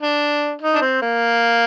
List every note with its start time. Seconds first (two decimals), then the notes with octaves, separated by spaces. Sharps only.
0.02 D4
0.62 D#4
0.75 D4
0.81 C4
1.01 A#3